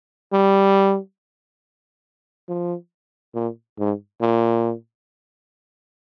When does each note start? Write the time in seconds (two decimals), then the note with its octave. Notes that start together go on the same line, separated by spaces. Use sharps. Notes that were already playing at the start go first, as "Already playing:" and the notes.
0.33 G3
2.48 F3
3.35 A#2
3.79 G#2
4.21 A#2